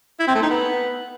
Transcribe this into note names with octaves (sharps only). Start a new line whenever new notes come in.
E4
C4
A3
D#4
B3